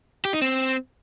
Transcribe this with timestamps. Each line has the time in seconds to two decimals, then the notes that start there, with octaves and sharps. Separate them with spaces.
0.25 G4
0.33 D#4
0.42 C4